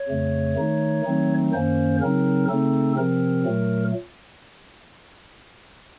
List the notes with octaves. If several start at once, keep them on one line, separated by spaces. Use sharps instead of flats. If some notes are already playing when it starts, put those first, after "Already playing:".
Already playing: C#5
F2 C#3 A3
D#3 A3 D#4
D#3 F#3 A3 C4 D#4
F#2 D#3 A#3 C#4 C5
C#3 F#3 C4 D#4 A#4
C#3 A3 C4 D#4 A4
C3 F3 C4 A#4
A#2 F#3 A3